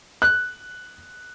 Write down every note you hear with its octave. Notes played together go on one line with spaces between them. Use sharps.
F#6